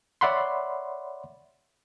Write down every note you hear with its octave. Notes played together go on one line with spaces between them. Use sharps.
C#5 D5 E5 F#5 B5 C6